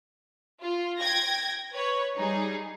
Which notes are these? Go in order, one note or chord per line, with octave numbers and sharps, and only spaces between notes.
F4
G5 G#6 A#6
B4 C#5
G3 D#4 G#4